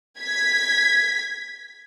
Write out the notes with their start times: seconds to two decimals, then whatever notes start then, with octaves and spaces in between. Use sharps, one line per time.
0.19 G#6 B6